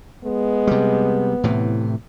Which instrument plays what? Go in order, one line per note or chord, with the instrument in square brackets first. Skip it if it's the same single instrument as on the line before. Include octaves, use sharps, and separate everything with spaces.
[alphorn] G#3 [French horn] B3
[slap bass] C3 G3
A2 C3 E3